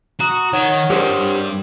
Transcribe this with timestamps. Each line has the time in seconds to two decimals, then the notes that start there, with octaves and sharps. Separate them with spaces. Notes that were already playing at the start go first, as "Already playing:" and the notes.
0.20 F#4 A#5 D#6
0.53 D#3 C#5 F#5
0.90 G2 G3 G4 A#4 C5